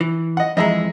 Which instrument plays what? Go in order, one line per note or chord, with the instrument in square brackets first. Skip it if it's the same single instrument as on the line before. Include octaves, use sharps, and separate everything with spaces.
[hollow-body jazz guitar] E3
[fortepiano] D#5 F#5
[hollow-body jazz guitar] F2 E3 G#3 [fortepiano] D#5 E5 A#5